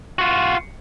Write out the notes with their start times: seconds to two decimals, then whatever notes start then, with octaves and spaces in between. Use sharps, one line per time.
0.19 F4 F#4